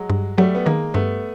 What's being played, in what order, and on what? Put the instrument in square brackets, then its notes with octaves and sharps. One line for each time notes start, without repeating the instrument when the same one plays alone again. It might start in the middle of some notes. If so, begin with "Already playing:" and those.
Already playing: [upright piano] F#3 G#3
[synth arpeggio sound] G2
[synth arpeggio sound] F#3 [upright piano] G3 A3
[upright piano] B3
[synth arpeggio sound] D#3 [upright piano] G#3 A#3
[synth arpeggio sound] G2 [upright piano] A3 B3